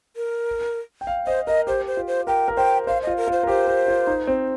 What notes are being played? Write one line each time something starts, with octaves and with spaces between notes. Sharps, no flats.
A#4
G5
F5
C5 D#5
A#4 D#5
G4 C5
C5
F4
C5
A#4 G5
A#4
C5 G5
C5 F5
F4 D#5
A#4
F4
C5
A#4
G4 C5
A#4
F4
D#4
C4